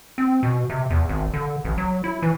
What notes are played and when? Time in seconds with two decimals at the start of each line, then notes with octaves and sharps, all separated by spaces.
0.18 C4
0.43 B2
0.70 C3
0.90 E2
1.09 G#1
1.34 D3
1.65 A1
1.78 F#3
2.04 E4
2.22 E3